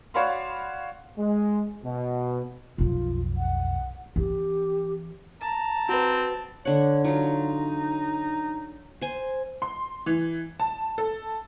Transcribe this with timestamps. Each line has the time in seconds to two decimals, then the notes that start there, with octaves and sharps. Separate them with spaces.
0.14 F#4 C#5 D5 F5 B5 C6
1.18 G#3
1.84 B2
2.78 B1 F2 F4
3.37 F#5
4.16 E3 C4 G4
5.41 A5 A#5
5.89 C4 F#4 B4
6.65 D3 C#5 F#5
7.05 F#3 D#4 F4
9.02 C5 G#5
9.62 C6
10.06 E3
10.60 A5
10.98 A4